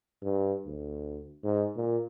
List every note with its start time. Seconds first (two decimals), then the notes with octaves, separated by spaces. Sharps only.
0.22 G2
0.66 D2
1.44 G#2
1.76 A#2